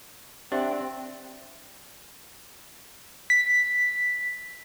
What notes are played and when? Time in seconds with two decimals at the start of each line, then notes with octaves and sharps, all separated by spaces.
0.52 C4 D4 G4 C5 E5 F#5
3.30 B6